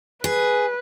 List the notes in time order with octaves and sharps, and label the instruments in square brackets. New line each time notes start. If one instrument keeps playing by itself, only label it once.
[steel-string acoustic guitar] G#4 [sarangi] B4